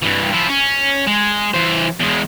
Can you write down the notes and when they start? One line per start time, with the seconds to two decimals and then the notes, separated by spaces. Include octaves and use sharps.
0.03 G2 E3
0.33 F3 E4
0.49 C#4
1.07 G#3
1.54 E3 C5
2.00 E2 G#3